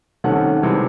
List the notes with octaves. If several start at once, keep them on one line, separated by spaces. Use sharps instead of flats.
C3 D#3 A3 C#4 F#5
C3 E3 G#3